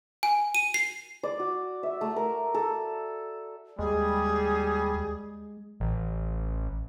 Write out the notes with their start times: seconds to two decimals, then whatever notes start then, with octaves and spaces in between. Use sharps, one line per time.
0.23 G#5
0.55 D#7
0.74 C7
1.23 D5
1.40 F#4
1.83 E5
2.01 A3
2.16 A#4
2.54 A4
3.79 D#2 G3 G#3 G#4
5.80 A1